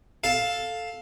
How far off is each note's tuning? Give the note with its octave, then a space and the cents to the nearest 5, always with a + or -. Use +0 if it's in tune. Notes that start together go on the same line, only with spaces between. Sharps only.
A4 +0 F5 +10